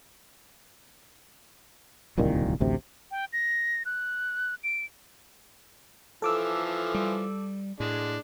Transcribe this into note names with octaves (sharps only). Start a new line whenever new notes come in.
D1 C2 A#2 D#3
A1 D2 C3
G5
A#6
F#6
D7
E3 F3 A4 D6 E6
G3
A2 G#3 D4